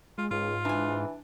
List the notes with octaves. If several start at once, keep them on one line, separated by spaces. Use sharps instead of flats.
G#3 F4
C#2 G#2 F4
E3 D4 G#5